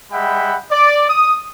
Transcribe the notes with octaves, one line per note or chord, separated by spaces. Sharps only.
G3 G#3 E5 F#5 G5 B5
D5
D#6